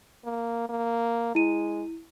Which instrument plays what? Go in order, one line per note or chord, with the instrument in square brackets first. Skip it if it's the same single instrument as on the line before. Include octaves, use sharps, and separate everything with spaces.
[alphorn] A#3
A#3
[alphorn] G#3 [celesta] E4 D#7